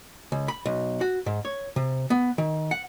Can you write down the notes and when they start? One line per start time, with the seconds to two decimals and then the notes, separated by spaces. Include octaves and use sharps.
0.32 C#2
0.48 B5
0.66 B1
1.01 F#4
1.26 G#2
1.45 C#5
1.76 C3
2.10 B3
2.38 D#3
2.71 F#5